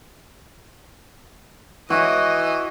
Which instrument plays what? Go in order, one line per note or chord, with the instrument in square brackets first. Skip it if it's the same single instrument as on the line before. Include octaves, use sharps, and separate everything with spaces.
[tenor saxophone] E3 [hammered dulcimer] F#4 [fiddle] D#5